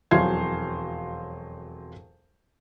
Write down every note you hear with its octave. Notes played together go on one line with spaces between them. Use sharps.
E1 F2 F#3 C5 F5 G#6